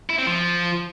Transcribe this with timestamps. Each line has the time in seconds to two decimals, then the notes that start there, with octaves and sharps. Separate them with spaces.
0.10 E4
0.18 C4
0.27 F3